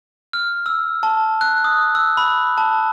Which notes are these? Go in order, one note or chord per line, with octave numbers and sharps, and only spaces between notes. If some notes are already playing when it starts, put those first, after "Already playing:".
F6
E6
A5
F#6
D#6
E6
B5
A5